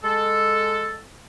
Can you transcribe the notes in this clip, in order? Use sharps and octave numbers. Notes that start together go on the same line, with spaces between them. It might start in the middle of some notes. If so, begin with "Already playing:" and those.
G#3 A4